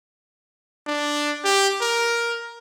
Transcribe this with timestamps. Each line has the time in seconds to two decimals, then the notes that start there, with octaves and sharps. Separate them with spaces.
0.87 D4
1.44 G4
1.81 A#4